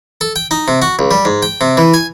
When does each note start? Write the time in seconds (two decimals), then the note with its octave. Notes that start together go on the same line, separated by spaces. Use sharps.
0.21 A4
0.36 G5
0.51 D#4
0.68 C3
0.82 F#4
0.99 C#2
1.11 G3
1.25 G#2
1.43 G5
1.61 C3
1.77 E3
1.94 G#5